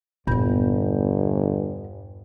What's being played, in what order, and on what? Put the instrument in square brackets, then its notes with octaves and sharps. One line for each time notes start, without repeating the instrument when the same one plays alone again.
[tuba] G1 [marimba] E2 G2 G6 [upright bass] A#2 B3